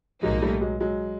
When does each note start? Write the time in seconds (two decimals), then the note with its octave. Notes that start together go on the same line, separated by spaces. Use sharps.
0.23 B1 A2 F3 F#3 G#3 A#3 D#4
0.42 G3 A3
0.61 F#3 G#3
0.80 F#3 G#3